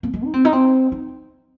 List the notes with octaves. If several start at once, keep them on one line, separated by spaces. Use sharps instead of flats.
A#3
G#3
D#4
C4
D#4
C4
D#4